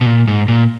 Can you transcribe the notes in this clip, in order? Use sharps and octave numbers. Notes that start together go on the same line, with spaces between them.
B2
A#2
G#2
A#2